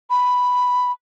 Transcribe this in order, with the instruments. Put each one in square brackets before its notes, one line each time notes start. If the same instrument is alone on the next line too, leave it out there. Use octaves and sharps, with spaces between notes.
[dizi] B5